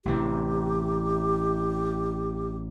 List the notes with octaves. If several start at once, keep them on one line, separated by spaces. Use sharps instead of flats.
A1 C3 E3 G4